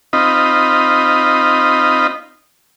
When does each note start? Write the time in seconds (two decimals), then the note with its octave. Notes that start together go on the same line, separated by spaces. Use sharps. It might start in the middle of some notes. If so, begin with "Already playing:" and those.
0.13 C4 D#4 F4 D#5 B5